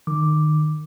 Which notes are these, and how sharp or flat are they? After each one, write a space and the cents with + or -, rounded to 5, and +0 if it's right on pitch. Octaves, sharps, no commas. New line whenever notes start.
D#3 -25 D6 +0